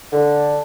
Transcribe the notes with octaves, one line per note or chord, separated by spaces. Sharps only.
D3